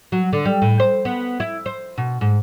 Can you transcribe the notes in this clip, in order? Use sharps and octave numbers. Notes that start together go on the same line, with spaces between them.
F#3
D3
G3
A2
C5
B3
E4
C5
B2
G#2